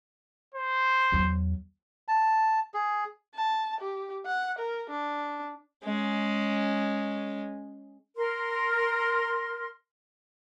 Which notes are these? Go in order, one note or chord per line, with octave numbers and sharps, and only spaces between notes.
C5
E2 F#3
A5
G#4
A5
G4
F#5
A#4
D4
G#3 C#4
A#4 C6 F6